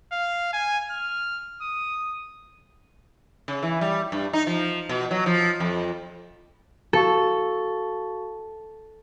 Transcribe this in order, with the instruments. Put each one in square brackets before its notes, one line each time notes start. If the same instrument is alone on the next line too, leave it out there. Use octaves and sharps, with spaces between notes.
[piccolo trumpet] F5
G#5
F6
D#6
[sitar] C#3
E3
G3
G2
D#4
F3
B2
F#3
F3
F2
[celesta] F#4 F5 C#6 [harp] A4